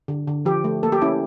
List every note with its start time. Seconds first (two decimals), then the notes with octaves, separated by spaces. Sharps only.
0.08 D3
0.27 D3
0.45 F3 G4
0.64 A3
0.83 A#3 A4
0.92 G4
1.02 C#4 E4